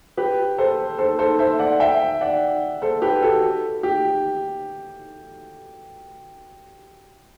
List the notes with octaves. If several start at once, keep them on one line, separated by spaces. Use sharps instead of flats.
G4 B4
A4 C5
A4 C5
A4 C5
C5 E5
D5 F#5
E5 G5
D5 F#5
A4 C5
G4 B4
F#4 A4
G4